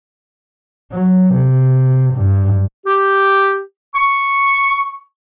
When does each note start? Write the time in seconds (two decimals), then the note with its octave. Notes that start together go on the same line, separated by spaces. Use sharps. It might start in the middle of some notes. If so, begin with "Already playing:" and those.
0.92 F#3
1.34 C3
2.14 G2
2.86 G4
3.94 C#6